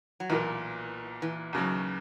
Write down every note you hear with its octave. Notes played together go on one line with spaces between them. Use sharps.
F#3
B1 A#2 E3 A#3
E3
D#2 C#3 F#3